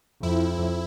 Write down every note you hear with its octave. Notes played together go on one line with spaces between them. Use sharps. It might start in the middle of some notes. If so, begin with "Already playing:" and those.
F2 E4